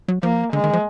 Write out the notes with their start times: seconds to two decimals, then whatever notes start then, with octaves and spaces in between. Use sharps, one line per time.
0.08 F#3
0.23 F3 A#3
0.53 D3 G#3
0.64 D#3
0.73 F3